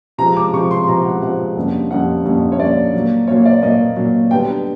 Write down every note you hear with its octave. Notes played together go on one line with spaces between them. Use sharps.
C3 F3 G#3 C4 A#5
D6
C3 F3 G#3 C4 C#6
C6
C3 F3 G#3 C4 A#5
F#5
C3 F3 G#3 C4 F#5
F2 D3 G3 A#3 C#4
F2 D3 G3 A#3 C#4 F#5
F2 D3 G3 A#3 C#4
C#5
F2 D3 G3 A#3 C#4 D5
A#2 F#3 A#3
A#2 F#3 A#3 C#5
D5
A#2 F#3 A#3 D#5
A#2 F#3 A#3
D3 G3 B3 G5